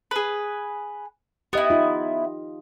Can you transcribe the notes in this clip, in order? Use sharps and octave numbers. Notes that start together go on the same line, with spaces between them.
G#4 B4
B3 E4 G4 D#5
D#4 F4